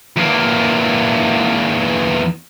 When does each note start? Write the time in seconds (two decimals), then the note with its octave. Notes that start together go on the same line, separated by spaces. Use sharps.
0.16 E2 A#3